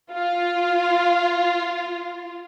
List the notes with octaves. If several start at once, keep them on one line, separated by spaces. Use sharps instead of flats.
F4 F5